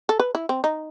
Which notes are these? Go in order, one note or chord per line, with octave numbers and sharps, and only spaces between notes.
A4
B4
E4
C4
D#4